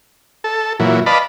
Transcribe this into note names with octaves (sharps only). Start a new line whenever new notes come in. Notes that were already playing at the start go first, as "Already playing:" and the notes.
A4
A#2 E3 F#3
B4 D5 D#5 F5 A5 B5